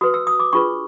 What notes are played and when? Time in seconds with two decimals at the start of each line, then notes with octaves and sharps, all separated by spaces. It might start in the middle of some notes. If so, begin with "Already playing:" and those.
0.01 F#4 B4 D#6
0.14 E6
0.27 D#6
0.40 D6
0.53 D4 F4 G#4 B4 C#6